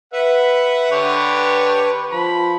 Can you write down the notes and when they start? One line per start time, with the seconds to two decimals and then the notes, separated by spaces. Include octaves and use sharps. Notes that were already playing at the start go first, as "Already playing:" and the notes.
0.13 B4 E5 F#5
0.92 D3 G4 C#5
2.12 F3 B5